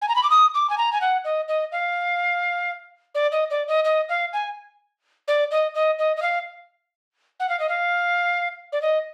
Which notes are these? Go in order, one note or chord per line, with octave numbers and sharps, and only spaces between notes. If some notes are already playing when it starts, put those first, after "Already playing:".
G#5
A#5
B5
D6
D#6
D6
G#5
A#5
G#5
F#5
D#5
D#5
F5
D5
D#5
D5
D#5
D#5
F5
G#5
D5
D#5
D#5
D#5
D#5
F5
F#5
F5
D#5
F5
D5
D#5